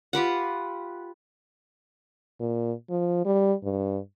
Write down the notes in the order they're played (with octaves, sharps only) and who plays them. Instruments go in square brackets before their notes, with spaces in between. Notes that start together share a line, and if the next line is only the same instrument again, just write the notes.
[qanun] F4 G4 B4 F#5
[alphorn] A#2
F3
G3
G2